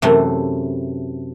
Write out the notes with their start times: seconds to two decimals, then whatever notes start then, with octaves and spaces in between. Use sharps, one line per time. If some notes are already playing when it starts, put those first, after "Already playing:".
0.02 F#2 C3 E3 A3